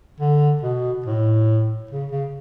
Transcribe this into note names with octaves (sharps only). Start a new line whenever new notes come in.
D3
B2
A2
C#3
C#3